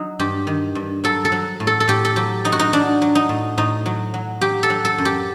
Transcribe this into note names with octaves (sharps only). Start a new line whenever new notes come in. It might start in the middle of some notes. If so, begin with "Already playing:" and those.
Already playing: F#3 D#4
G2 G4
D#3
G2
F#3 A4
A4
F#3
A2
A4
A4
A2 G4
A4
F#3 G4
F#3 D#4
F#4
D#4
F#3 D4
F#3
D#4
A2
A2 D#4
F#3
F#3
F#3 G4
A4
F#3
A4
F#2
G4